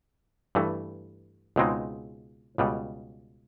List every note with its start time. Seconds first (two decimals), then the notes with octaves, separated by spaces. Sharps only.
0.55 G2 E3 A3
1.56 C#2 B2 G#3 C4 D#4
2.58 C#2 B2 G3